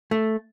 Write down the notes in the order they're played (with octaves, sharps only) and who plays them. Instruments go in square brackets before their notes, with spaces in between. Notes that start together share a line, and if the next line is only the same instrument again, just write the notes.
[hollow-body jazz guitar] A3